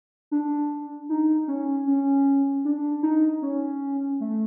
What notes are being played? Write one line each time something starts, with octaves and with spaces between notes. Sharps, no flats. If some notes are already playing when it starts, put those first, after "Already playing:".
D4
D#4
C#4
C#4
D4
D#4
C#4
A3